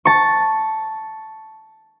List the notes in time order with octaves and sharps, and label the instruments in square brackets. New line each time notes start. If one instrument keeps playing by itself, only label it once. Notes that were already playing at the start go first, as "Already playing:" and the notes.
[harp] A5 C#6